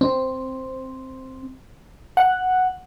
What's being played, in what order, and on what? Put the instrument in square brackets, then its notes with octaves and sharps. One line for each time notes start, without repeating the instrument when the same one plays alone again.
[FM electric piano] C4
F#5